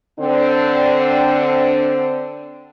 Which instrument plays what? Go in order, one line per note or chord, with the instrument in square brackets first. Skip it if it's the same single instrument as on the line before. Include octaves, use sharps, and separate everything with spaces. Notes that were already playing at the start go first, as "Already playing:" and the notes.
[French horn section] D3 C4 D4